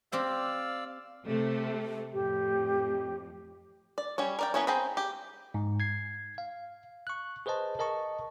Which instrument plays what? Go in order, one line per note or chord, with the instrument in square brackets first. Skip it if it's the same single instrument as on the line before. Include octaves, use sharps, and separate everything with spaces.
[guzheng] C4 G4 C5 [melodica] D5 F5 E6
[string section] C3 A3
[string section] F2 A2 [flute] G4
[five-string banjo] D5
G3 C#4 C#5
A#4 D5 G5
A#3 B3 C#4 E4 C#5
C4 G#4 G5 A#5 B5
G4
[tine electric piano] G#2
G#6 C7
F5
C#6 F#6
G#4 B4 C5 D#5 A5
A#4 D#5 A5 C#6